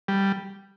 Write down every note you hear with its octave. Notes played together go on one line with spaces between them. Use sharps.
G3